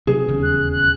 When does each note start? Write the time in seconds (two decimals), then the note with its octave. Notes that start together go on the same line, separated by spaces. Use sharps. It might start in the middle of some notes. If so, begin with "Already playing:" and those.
0.07 C3 F#3 G#4
0.28 D#1 E2 C#3
0.43 F#6
0.72 F#6